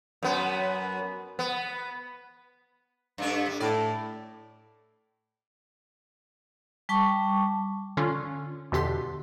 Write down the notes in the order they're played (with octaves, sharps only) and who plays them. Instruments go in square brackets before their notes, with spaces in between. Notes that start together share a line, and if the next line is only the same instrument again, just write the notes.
[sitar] F#2 B3
B3
G2 A3 D4
G3
[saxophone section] A2 [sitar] D5
[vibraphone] G3 G5 A5 C#6 D6
[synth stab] D3 C#4 F4
E2 B2 D3 G4 C6 B6